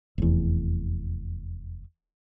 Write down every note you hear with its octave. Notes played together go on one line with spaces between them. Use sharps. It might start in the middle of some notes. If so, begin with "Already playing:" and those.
F1 E2